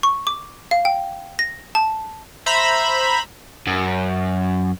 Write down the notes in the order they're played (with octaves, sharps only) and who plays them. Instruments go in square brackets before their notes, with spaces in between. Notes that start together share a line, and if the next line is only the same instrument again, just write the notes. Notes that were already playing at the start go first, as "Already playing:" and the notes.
[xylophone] C#6
D6
F5
G5
A#6
A5
[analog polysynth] C5 E5 A#5 B5
[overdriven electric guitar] F#2